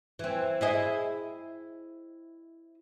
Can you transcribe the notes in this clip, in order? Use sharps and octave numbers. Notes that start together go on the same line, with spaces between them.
E3 C4
E4 G#4 D#5